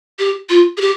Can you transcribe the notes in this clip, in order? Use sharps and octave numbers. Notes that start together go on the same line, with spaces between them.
G4
F4
G#4
G4